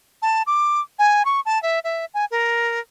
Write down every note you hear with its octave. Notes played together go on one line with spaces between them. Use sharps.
A5
D6
G#5
C#6
A5
E5
E5
G#5
A#4